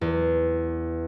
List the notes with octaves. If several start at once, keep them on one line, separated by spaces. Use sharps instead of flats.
E2